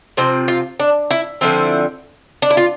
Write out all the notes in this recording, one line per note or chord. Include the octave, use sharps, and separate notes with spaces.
C3 F3 C4 C5
F4
D4
E4
D3 F3 C4 E4
D4
E4
F4